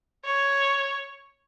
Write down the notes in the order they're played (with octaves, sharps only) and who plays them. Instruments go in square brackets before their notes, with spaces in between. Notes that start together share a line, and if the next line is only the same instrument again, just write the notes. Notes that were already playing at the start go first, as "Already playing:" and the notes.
[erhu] C#5